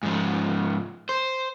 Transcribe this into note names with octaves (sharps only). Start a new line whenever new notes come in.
G#2 F3
C5